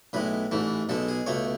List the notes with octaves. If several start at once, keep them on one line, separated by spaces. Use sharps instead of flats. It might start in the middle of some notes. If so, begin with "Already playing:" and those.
B1 A2 G#3 B4
A1 G#2 E3 A3
B1 B2 G#3 A4
G#4
C#2 B2 A3 C#5